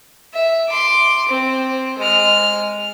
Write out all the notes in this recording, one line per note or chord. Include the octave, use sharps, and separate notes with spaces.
E5
C6 D6
C4
G#3 F6